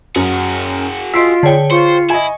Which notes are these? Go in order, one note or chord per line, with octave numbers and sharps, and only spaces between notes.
F#2 F#4 G#4
F4 D#5 C6 E6 B6 C7 D7
D3 G#4 C#5 G5
F4 C5 C#6 C#7
E4 D#5 G#5